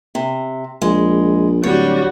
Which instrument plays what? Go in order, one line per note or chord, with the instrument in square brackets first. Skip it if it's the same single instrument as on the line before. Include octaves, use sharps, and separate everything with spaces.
[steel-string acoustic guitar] C3
[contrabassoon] A#1 [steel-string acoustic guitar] G#3
[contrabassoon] D1 [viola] G3 F#4 [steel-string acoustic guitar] C#5